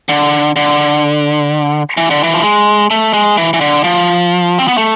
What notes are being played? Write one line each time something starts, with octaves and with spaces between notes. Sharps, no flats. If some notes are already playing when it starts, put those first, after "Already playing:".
D3
D3
E3
D3
E3
F3
G#3
A3
G#3
E3
E3
D3
F3
C4
B3
A3